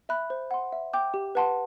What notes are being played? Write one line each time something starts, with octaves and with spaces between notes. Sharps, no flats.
E5 B5 F#6
C5
F#5 C6
E5
G5 D6 G6
G4
B4 F#5 A5 C6